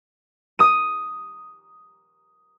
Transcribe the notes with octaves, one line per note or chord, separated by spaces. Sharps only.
D#6 D#7